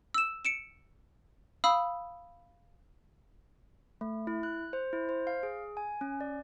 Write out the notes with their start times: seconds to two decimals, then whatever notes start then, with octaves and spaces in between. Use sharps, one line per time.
0.14 E6 E7
0.45 C#7 D7 E7
1.64 F5 B5 D#6 E6
4.01 A3
4.27 E4
4.43 F#6
4.73 C5
4.93 E4
5.09 C5
5.27 F5
5.43 G#4
5.77 G#5
6.01 C#4
6.21 D5